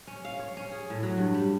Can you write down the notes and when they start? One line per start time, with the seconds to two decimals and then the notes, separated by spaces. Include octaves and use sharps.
0.07 C#4
0.25 F5
0.40 C#5
0.57 C#4
0.72 G#4
0.90 A2
1.03 F#3
1.18 G2
1.34 G3